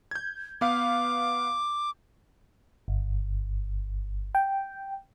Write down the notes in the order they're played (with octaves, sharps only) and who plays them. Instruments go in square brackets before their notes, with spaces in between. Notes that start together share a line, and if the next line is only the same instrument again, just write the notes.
[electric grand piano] G6 G#6
[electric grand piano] B3 B4 F5 [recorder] D6
[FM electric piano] G1
G5